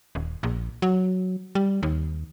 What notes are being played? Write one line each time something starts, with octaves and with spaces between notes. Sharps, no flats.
D#1
A#1
F#3
G3
D#2